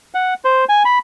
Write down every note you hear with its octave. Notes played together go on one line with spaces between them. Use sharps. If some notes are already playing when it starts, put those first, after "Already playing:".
F#5
C5
G#5
B5